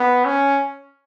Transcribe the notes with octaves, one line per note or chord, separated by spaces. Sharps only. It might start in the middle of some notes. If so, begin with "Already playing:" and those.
Already playing: B3
C#4